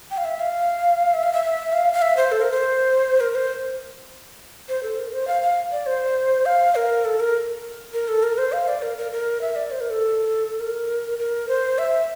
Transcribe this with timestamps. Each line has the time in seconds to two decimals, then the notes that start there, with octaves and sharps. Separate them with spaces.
0.11 G5
0.17 F5
0.25 E5
0.40 F5
1.14 E5
1.23 F5
1.33 E5
1.73 F5
1.93 F5
2.02 E5
2.17 C5
2.32 A4
2.41 A#4
2.51 C5
3.20 A#4
3.35 C5
4.69 C5
4.83 A4
4.98 A#4
5.13 C5
5.28 F5
5.42 F5
5.72 D5
5.86 C5
6.46 F5
6.75 A#4
7.05 A4
7.20 A#4
7.93 A#4
8.08 A4
8.23 A#4
8.38 C5
8.52 F5
8.68 D5
8.82 A#4
8.97 A#4
9.12 A#4
9.41 E5
9.56 D5
9.71 C5
9.81 A#4
9.90 A4
10.60 A#4
11.19 A#4
11.49 C5
11.78 E5